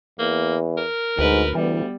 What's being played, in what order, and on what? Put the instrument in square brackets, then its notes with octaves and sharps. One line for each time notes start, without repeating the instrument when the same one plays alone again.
[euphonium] E2 [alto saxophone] A#3
[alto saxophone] A#4
[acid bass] D2 [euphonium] G#2 [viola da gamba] B4
[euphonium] D2 [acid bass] E3 [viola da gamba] G3 B3